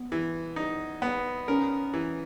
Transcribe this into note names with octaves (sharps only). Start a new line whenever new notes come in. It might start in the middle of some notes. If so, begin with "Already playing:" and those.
Already playing: B3
E3
D#4
B3
C#4 A#4
E3